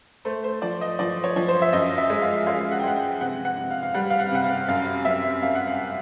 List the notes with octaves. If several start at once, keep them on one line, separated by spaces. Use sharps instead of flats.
A3 C5
C5
F3 D5
D#5
F3 D5
C#5
F3
C5
E5
F#2 D#5
E5
G#3
F5
G#3 F5
F#5
G5
G#3 F#5
G5
C3 F#5
F#5
C3
F5
F5
G3 F#5
F5
F#5
C3 F#5
F5
F#2 F5
F#2 E5
F#2 F5
F#5
F5